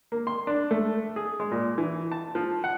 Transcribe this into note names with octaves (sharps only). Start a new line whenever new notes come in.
A#3
C6
D4
A3
G#4
G#3
A#2
E3
A5
F3
F#5